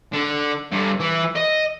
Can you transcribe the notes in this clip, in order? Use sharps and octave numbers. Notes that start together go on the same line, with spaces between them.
D3
G2 D3
E3
D#5